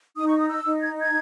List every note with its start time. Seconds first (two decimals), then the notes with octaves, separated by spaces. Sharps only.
0.17 D#4 D#6
0.28 C#6
0.38 D#6
0.49 E6
0.65 D#4
0.81 G#6
1.00 G#6